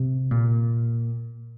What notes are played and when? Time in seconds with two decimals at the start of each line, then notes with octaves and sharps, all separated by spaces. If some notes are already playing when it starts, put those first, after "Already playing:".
Already playing: C3
0.31 A#2